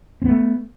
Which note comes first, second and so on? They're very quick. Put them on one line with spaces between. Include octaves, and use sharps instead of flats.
C4 B3 A3